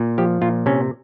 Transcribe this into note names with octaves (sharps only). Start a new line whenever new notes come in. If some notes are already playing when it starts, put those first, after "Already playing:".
Already playing: A#2
F3 G4
A#2 F4
C3 C#4